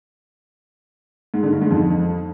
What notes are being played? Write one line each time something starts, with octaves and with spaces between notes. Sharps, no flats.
G#2
D3
G2
G#2
F2